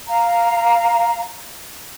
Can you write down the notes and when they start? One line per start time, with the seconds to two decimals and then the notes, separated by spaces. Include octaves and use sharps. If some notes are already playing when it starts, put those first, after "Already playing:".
0.08 F5 A#5